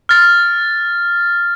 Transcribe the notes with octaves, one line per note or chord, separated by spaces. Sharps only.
F6 A6